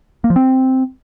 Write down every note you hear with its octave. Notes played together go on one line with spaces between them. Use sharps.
A#3
F3
C4